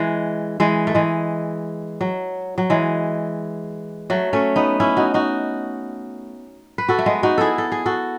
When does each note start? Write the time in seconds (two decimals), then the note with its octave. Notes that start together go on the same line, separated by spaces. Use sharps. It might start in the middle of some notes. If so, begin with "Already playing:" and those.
Already playing: E3 G#3
0.60 E3 G#3
0.87 A3
0.95 E3 G#3
2.01 F#3
2.58 F#3
2.70 E3 G#3
4.10 F#3 A3
4.33 A3 C#4
4.56 B3 D#4
4.80 C#4 E4
4.97 D#4 F#4
5.14 D#4 F#4
6.78 B4
6.89 F#4 A4
6.99 A3
7.06 G#3 B3
7.23 D#4 F#4
7.38 E4 G#4 A4
7.58 A4
7.72 G#4
7.86 F#4 A4